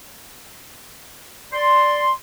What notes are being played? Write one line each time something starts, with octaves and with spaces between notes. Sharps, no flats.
D5 C6